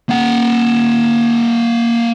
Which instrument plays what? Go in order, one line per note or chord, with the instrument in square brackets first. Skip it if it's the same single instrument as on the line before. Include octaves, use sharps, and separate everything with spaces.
[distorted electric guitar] A#3 F#5